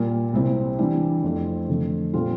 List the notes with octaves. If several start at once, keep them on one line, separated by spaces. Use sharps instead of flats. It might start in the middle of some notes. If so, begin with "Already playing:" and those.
Already playing: A#2 G3 A#3
C2 C3 G3 C4 E4
E3 G3 D4
F2 E3 A3 C4
F2 D3 A3
A#2 G3 C4 F4 A4